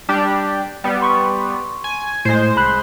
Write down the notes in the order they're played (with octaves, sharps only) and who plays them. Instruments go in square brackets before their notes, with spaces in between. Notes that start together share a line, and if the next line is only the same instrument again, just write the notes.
[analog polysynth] G3 D4 G4
G3 B3
[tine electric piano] C6 C#6
[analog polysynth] G#5
[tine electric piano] A2 [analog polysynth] G#3 C5
[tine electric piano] C2 B5 F#6